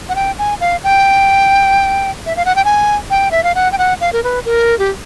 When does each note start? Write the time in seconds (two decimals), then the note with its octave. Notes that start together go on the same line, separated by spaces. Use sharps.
0.09 F#5
0.16 G5
0.39 G#5
0.61 F5
0.84 G5
2.26 E5
2.37 F5
2.45 F#5
2.56 G5
2.65 G#5
3.10 G5
3.31 E5
3.43 F5
3.55 F#5
3.72 G5
3.78 F#5
4.01 F5
4.13 A#4
4.24 B4
4.45 A#4
4.79 G4